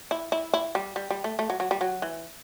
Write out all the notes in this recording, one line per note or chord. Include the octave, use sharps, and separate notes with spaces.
E4
E4
E4
G3
G3
G3
A3
A3
F#3
F#3
G3
F#3
E3